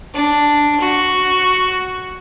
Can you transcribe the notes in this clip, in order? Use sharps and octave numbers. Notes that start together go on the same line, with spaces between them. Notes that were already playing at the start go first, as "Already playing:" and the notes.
D4
F#4